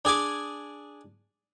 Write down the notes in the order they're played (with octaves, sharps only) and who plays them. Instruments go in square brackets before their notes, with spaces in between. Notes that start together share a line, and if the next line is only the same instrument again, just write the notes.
[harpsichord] D4 G#4 G#5 D6